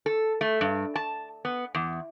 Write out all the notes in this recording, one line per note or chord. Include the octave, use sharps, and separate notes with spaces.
A4
A3
G2
A5
B3
E2